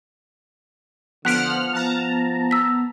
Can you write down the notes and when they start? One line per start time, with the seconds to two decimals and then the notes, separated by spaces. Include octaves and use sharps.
1.25 D3 F3 B3 F#5 F6 F#6 B6 D7
1.73 F3 A5 A#5
2.51 E6 B6